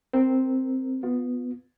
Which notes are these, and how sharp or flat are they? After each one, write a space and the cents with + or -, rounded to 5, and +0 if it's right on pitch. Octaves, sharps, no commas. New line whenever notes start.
C4 +0 A#4 -10
B3 +5 F4 +25